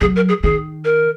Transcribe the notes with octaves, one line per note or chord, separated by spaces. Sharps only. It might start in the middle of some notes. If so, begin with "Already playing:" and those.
F#3 G#4
A#4
G#4
D#3 G#4
A#4